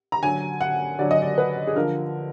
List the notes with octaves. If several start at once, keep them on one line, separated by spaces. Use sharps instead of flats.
A#5
D3 F#3 G#5
F#5
D3 F#3 D5
D#5
D5
B4
G#4
D3 F3 A#4